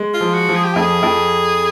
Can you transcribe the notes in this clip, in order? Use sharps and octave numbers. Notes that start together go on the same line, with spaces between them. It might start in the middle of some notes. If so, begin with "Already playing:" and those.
Already playing: G#3
F4
F3
F#4
F3
G#4
G4
F2 G#4
F2